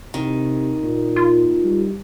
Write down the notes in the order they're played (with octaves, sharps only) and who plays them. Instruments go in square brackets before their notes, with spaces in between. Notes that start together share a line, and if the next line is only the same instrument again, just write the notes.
[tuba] C3 [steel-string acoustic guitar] D#3
[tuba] A#2
[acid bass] F4
[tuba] G3